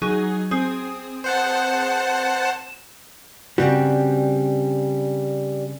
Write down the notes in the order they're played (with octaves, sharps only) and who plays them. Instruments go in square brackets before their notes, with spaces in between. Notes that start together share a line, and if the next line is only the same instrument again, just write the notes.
[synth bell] F#3 D#4 G#4
C4 G#4 D#6
[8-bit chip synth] C5 F#5 A5
[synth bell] E7
[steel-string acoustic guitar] G2 C#3 C4 [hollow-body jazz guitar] G3 F#4